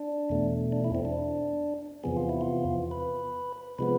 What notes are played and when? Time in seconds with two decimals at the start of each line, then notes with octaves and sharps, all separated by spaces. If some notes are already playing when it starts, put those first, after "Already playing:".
Already playing: D4
0.30 E2 B2 A3
0.72 D4
0.84 E4
0.95 C4
1.05 D4
2.04 E2 C3 F3 B3 G#4
2.17 F4
2.29 E4
2.41 F4
2.91 B4
3.79 C3 F3 G#3 B3 B4